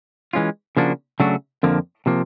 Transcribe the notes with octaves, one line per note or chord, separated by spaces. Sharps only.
E3 G#3 C#4 F4
C#3 F3 A#3 D4 F#4
C#3 F#3 A3 D4 F#4
F2 D3 F3 A#3
C3 F3 A#3